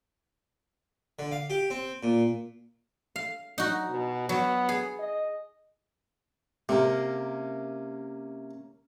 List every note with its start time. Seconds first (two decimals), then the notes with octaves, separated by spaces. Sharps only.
1.19 D3
1.31 F5
1.50 G4
1.70 C4
2.03 A#2
3.16 F5
3.58 F#3 D#4 F#4
3.89 B2
4.29 F#3 B3
4.69 G#4
4.99 D#5
6.69 C3 A#3 C#4 A#4